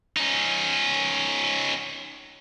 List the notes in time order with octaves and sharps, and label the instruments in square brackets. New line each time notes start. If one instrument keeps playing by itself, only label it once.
[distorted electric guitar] C#4 D#4